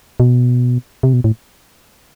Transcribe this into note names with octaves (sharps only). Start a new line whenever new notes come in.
B2
C3
B2
A2